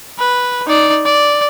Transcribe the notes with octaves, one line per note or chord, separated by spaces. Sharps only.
B4
D#4 D5
D5